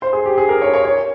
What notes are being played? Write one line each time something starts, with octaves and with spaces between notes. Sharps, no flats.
C5
G#4
G4
G#4
A#4
C#5
C#5
C#5